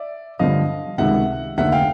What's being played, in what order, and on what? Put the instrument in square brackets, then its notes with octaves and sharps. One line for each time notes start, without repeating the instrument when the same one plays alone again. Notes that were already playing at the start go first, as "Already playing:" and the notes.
Already playing: [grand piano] D5 E5
[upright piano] G2 D3 F3 [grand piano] D#5 F5
[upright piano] C#2 C3 D#3 [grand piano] E5 F#5
[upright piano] F1 D#2 D3 [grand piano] E5 F#5
[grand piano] F5 G5